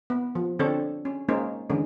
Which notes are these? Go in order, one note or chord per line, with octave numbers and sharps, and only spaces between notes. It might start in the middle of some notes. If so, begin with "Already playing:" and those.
B3
F3
D3 C4 D4 A4 C#5
C#4
G#3 A#3 C#4 D#4 C5
D3 E3 G#3 C#4